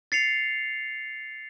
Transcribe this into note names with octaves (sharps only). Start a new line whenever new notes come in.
A6 C7 C#7 F7